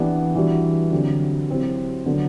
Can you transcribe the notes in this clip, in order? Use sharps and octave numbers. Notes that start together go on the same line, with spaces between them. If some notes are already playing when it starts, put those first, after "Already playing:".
Already playing: E3 B3 D4 G4
E3 G3 D4 F#4
D3 F#3 C4 G4
F#3 C4 E4 G4
D3 F#3 B3